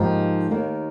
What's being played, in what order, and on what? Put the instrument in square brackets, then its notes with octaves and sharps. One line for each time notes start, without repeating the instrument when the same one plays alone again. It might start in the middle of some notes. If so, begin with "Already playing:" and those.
Already playing: [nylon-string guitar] G#2 F3 A#3 D#4 G4
D#2 D#3 A#3